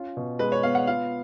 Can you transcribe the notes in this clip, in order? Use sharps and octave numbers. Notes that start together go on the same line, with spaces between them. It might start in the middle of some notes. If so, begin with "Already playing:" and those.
Already playing: C#4 F4
B2
G#3 B4
C#5
B3 F5
F#5
F4 F5